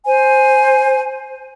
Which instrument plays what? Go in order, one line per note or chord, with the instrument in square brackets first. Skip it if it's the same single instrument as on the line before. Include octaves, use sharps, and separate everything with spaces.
[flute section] C5 G#5